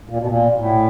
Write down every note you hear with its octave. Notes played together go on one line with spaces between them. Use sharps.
A#2
B2
A#2
A2